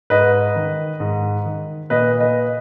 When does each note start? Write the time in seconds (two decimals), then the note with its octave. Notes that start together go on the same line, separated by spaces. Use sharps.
0.10 G#2 B4 D#5
0.56 D#3
1.00 G#2
1.45 D#3
1.90 A#2 B4 D#5
2.20 B4 D#5